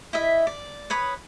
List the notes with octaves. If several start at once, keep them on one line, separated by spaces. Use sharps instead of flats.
E4 D#5 E5
D5
B4 C#5 B5 D#6